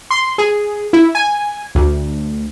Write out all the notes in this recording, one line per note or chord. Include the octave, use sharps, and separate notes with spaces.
C6
G#4
E4
G#5
D2